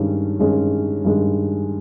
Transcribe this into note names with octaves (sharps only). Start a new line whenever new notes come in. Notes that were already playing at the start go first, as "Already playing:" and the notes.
Already playing: G2 D#3 G#3 C#4
G2 D#3 G#3 C#4
G2 D#3 G#3 C#4